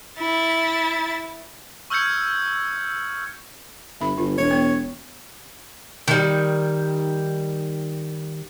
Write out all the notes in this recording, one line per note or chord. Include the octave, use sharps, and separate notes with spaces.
E4 A6
C#6 E6 F6 G6 G#6 C#7
G1 E5 B5
G1 F4
E1 C#5
B3
D#3 G3